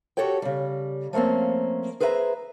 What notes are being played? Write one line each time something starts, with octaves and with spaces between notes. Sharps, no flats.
F#4 G4 A4 C#5 G5
C#3 G3
F3 A3 A#3 C4 C#4
G#4 B4 C5 E5 F5 A#5